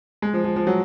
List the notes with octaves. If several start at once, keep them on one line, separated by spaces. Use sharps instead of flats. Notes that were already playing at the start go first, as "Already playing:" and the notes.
G#3
F3
F3
F3
F#3